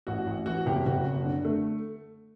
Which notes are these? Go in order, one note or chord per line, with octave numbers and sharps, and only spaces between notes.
A1 F#4
A1
E3 F#4
F#1 G4
F#1 F#4
F#1
D3
A3